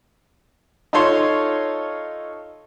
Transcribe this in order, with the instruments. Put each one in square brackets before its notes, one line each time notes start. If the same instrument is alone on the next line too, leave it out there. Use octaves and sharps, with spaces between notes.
[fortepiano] D#4 F4 A4 C#5 C6